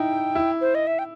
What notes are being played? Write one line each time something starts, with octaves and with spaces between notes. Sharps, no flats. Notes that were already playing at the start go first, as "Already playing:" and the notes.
Already playing: D#4 E4 G5
E4
C5
D#5
E5
G5